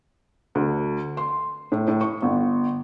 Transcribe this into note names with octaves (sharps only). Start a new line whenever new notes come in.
D2
C6
A2
A2
C#6
G1